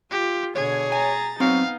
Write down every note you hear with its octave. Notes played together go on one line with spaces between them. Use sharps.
F4 G4
B2 D3 G#4 C#5 G#6
G#5 A#5 A6
F#3 B3 C4 D#4 F5